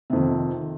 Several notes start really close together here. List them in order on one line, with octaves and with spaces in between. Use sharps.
C3 F2 D#3